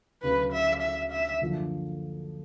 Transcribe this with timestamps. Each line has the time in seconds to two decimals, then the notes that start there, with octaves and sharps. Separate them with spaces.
0.22 D2 C#3 F#3 B4
0.52 E5
0.82 E5
1.11 E5
1.41 F#2 D3 F3 A#3 D4